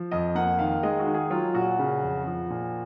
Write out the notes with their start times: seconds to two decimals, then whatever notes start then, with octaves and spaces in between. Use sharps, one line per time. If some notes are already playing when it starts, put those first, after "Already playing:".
Already playing: F3
0.11 F2 D#5
0.35 A#3 F#5
0.59 D#3 F5
0.83 G#3 D#5
0.99 F#4
1.06 D#3
1.14 G#4
1.30 F#3 F4
1.55 A#2 F#4
1.79 C#3
2.02 F2
2.27 F3
2.50 A#2